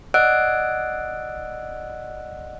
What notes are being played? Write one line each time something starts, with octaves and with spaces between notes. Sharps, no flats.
D5 D#5 F#5 E6 F#6 D7